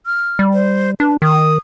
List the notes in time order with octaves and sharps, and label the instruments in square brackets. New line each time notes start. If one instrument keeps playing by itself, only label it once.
[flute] F6
[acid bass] G3
[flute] C5
[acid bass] D4 [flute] B4
[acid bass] D#3 [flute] D#6